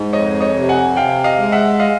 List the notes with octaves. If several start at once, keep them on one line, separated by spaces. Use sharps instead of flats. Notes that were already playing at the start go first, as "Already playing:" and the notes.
Already playing: G#2
F2 C#5 D#5
C#5 D#5
C3
F#5 G#5
C3 F5 G5
D#5 F5
G#3
E5 F#5
D#5 F5